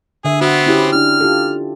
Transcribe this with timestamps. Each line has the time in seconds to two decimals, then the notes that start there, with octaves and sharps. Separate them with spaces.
0.25 D3 G#4 E5
0.41 B3 C4 F#4
0.66 C#4 E4 G4
0.93 D4 E4 F6
1.20 F4 G4 A4